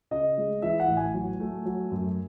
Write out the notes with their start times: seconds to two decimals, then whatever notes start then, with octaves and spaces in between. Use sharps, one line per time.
0.11 C#3 D#5
0.38 G#3
0.62 E3 E5
0.80 F#5
0.88 A1
0.97 G#5
1.14 F#3
1.40 A3
1.65 F#3
1.91 F#2